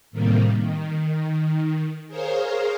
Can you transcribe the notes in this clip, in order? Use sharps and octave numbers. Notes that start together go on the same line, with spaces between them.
A2 C3 D#3 G3 A#3
D#3
G#4 A#4 C5 C#5 F5